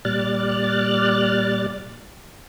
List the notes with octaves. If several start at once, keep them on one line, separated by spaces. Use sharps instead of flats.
A#2 G3 D5 F6 F#6 A6